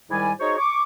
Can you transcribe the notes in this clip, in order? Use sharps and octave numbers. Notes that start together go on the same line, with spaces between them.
G#2 D#3 G3 E4 D5 G#5
D#4 F#4 G#4 C5 C#5
C#6 D6